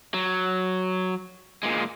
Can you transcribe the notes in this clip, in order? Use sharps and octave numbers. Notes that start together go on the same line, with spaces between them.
F#3
A#2 G#3